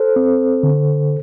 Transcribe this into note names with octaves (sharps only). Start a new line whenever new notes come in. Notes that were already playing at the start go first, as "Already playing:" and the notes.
Already playing: A4 C5
C4
D3